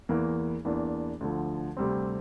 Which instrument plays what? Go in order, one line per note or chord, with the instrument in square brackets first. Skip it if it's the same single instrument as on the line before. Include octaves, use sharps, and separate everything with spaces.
[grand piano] E2 E3 A#3
E2 E3 A#3 D4
D2 D3 F3
D2 C3 G3 C4